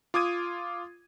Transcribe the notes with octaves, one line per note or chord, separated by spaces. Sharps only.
F4 D6 D#6 G#6 D#7